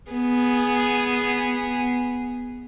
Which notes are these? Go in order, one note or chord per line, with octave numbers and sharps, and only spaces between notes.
B3 G#4